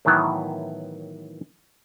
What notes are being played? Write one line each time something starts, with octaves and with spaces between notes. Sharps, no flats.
A2 D#3 E3 F#3 B3 E4